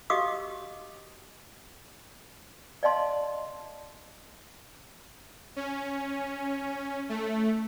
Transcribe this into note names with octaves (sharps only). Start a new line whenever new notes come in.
F#4 G4 D#5 F5 D6 D#6
D5 D#5 F5 A5 C6
C#4
A3